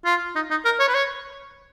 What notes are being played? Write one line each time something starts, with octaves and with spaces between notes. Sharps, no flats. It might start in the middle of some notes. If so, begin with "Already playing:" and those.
F4
D#4
D#4
A#4
C#5
B4
C#5